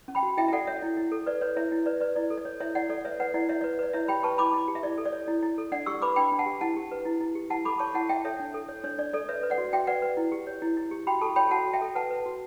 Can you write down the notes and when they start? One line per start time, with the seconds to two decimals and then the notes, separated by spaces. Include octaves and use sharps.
0.08 C#4
0.15 G5 B5
0.23 F#4
0.37 E4 E5 G5
0.48 E5
0.53 A4 D5 F#5
0.67 C#5 E5
0.82 E4
0.97 E4
1.12 A4
1.26 B4 D5
1.41 B4 C#5
1.57 E4 C#5 E5
1.72 E4
1.86 B4 D5
2.00 B4 D5
2.16 E4 D5
2.30 A4
2.37 D5
2.45 C#5
2.60 E4 C#5 E5
2.75 E4 D5 F#5
2.90 A4 D5
3.05 B4 C#5 E5
3.20 B4 D5 F#5
3.34 E4 D5 F#5
3.49 E4 C#5 E5
3.61 B4 D5
3.79 B4 D5
3.93 E4 C#5 E5
4.08 G4 G5 B5
4.23 B4 A5 C#6
4.38 E4 B5 D6
4.53 E4
4.68 G4
4.75 E5
4.83 E4 D5
4.98 A4
5.05 D5
5.12 C#5
5.28 E4
5.43 E4
5.58 A4
5.72 D4 D5 F#5
5.86 G4 C#6 E6
6.02 B4 B5 D6
6.16 D4 G5 B5
6.32 D4
6.39 F#5 A5
6.46 G4
6.61 E4 F#5 A5
6.76 G4
6.91 B4
7.05 E4
7.20 E4
7.35 G4
7.50 E4 F#5 A5
7.65 A4 B5 D6
7.79 C#5 A5 C#6
7.94 E4 F#5 A5
8.09 E4 E5 G5
8.25 A4 C#5 E5
8.40 D4
8.54 A4
8.69 C#5
8.84 D4 C#5
8.99 D4 D5
9.13 A4 D5
9.28 B4 C#5 E5
9.43 B4
9.50 D5 F#5
9.58 F#4
9.73 F#4 E5 G5
9.87 B4 D5 F#5
10.02 B4
10.17 E4
10.32 G4
10.47 C#5
10.62 E4
10.77 E4
10.91 G4
11.07 F#4 G5 B5
11.21 A4 A5 C#6
11.36 C#5 G5 B5
11.51 F#4 F#5 A5
11.66 F#4
11.73 E5 G5
11.81 A4
11.95 B4 F#5 A5
12.11 B4
12.26 F#4